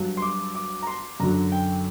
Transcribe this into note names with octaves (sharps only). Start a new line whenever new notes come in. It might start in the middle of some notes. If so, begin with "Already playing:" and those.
Already playing: G2 F#3
C6
D6
D6
A#5
C6
F#2 D3 F#3 A#5
G5